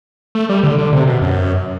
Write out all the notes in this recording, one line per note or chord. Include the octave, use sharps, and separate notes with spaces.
A3
G3
D3
D3
C3
B2
F#2